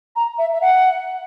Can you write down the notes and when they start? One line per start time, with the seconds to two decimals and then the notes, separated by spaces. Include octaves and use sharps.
0.16 A#5
0.39 E5
0.53 E5
0.62 F#5